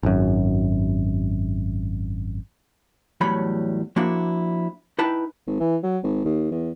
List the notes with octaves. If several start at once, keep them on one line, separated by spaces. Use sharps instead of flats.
G#1 F#2
E2 A2 F#3 G3 C#5 B5
F3 A#3 D4 E4 F#4
D#4 E4 B4 G5 A5
G#1
E3
F#3
G#1
D#2
E2